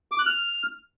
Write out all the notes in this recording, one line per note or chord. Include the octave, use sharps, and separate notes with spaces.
D6
F#6
F6